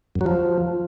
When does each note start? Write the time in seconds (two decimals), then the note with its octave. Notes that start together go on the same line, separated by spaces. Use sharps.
0.16 F#2
0.21 F#3
0.26 F3